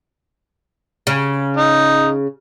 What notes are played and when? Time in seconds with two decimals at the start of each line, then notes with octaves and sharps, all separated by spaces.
1.07 C#3
1.57 D#4